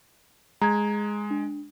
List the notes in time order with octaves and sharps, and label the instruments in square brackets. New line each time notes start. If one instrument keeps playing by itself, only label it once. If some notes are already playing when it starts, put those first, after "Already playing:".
[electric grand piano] G#3 [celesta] A#5 G#6
[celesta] D4